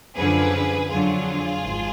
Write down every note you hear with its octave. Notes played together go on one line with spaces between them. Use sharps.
F#2 D3 F3 G#4 B4
F2 D3 F#3 F4 G#4
G#1